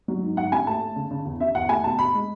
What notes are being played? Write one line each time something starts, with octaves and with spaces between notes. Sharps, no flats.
F#3
G#2
G#2 F#5
C#4 G#5
A3 A5
A3
C#3
C#3
E2
C#4 E5
E2 F#5
A3 G#5
B2 A5
B2 B5
G#3